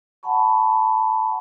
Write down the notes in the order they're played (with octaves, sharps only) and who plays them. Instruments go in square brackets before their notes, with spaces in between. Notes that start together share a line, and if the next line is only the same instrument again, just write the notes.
[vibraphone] F#5 G#5 A5 B5 C#6